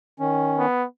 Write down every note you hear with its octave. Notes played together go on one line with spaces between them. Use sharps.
D#3 C#4
B3